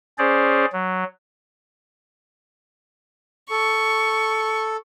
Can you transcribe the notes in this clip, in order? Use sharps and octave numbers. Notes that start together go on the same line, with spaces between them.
C#4 G#4 C5 D5
F#3
A4 C#6